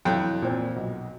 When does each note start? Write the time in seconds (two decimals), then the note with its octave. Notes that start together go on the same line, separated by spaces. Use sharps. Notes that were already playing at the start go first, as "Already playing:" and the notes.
0.05 F2 E3 F#3 G5 F#6
0.42 A#2 C4
0.76 B1